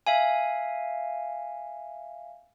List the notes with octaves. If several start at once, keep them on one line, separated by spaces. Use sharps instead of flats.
E5 F5 G#5